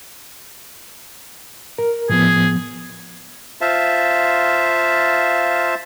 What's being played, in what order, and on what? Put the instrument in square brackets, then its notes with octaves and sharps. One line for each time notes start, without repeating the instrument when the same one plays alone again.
[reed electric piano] A#4
[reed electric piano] A2 F3 B3 [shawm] G#4
[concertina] F4 C5 E5 F5 A5